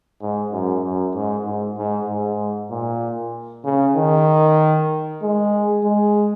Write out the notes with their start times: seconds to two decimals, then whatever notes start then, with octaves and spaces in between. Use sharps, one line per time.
0.22 G#2
0.52 F#2
0.84 F#2
1.15 G#2
1.46 G#2
1.78 G#2
2.08 G#2
2.71 A#2
3.65 C#3
3.97 D#3
5.22 G#3
5.84 G#3